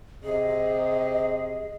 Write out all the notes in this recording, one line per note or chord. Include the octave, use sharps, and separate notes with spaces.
C3 G#4 D#5